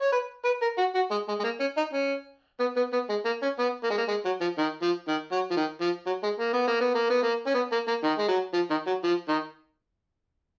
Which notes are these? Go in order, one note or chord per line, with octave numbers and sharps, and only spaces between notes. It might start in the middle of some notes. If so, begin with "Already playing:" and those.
C#5
B4
B4
A#4
F#4
F#4
G#3
G#3
G#3
A#3
C#4
D#4
C#4
B3
B3
B3
G#3
A#3
C#4
B3
A#3
G#3
A#3
G#3
F#3
F3
D#3
F3
D#3
F#3
F3
D#3
F3
F#3
G#3
A#3
B3
A#3
B3
A#3
B3
A#3
C#4
B3
A#3
A#3
D#3
G#3
F#3
F3
D#3
F#3
F3
D#3